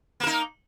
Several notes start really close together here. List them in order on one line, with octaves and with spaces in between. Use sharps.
A#3 A#4 D#4